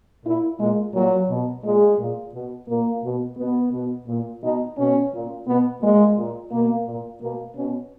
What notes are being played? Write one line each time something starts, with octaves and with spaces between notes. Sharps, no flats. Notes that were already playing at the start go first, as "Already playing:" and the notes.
A#2 E4
A#2 G#3
A#2 F#3
B2
A#2 G#3
A#2
B2
A#2 A#3
B2
B2 B3
B2
A#2
B2 D#4
B2 C#4
A#2
B2 B3
A#2 G#3
A#2
B2 A#3
A#2
B2 A#3
B2 C#4